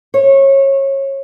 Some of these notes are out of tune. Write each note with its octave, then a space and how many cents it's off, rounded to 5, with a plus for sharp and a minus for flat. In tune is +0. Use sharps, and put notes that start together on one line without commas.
C#5 -25